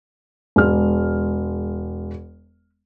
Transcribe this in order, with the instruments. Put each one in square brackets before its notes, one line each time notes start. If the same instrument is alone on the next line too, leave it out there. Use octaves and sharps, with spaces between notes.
[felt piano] E1 G#3 F6